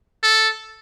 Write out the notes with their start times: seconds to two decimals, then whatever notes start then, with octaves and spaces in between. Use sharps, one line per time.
0.23 A4